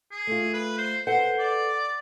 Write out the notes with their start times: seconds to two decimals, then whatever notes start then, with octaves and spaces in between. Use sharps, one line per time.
0.11 G#4
0.27 A3 F4
0.54 B4
0.78 C5
1.07 A4 B4 C5 F#5
1.39 D5